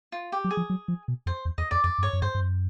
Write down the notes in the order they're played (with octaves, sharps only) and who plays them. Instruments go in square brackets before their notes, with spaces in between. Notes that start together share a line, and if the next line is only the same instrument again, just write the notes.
[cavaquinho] F4
G4
[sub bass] F#3
[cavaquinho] G#4
[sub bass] F3
F#3
F3
B2
[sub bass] F2 [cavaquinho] C5
[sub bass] E2
[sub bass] E2 [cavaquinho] D#5
[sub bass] F2 [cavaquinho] D5
[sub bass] F2 [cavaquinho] D5
[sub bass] F#2
[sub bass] G2 [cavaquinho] C#5
[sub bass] F#2
[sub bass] G2 [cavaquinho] C5
[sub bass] G2
F#2